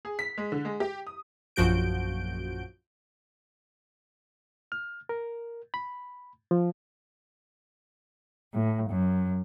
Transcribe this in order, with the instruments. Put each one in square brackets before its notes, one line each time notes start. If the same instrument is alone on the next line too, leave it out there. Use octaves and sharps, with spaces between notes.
[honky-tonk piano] G#4
B6
G#3
D3
G#3
G4
D#6
[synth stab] A#1 F#2 F3 F#4 G6 D7
[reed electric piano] F6
A#4
B5
F3
[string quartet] A2
F#2